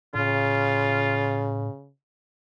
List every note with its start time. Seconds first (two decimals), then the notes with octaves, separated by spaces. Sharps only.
0.15 A2 C#3 F4